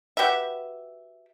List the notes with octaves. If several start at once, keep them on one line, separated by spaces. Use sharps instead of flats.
F#4 G4 B4 E5